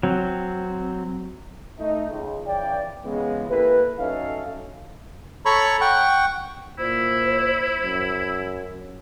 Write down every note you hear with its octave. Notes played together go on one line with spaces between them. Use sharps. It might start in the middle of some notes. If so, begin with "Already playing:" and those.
F#3 C4
A3 D#4
C#2
C#3 E3 D5 G5
C#3 E3 G#3 B3
A#3 E4 G4 A4 B4
F#3 C#4 D#4 A4 E5 F5
A4 C#5 A#5 B5 C#6
F#5 G5 C#6
A#2 E4 C5
F#2